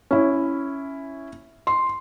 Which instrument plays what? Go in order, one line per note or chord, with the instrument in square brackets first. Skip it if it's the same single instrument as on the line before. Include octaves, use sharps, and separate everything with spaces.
[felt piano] C#4 E4
C6